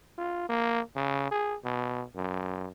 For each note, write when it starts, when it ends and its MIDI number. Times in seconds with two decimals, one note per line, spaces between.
0.18 0.46 65
0.49 0.80 58
0.96 1.28 49
1.31 1.55 68
1.64 2.04 47
2.15 2.68 42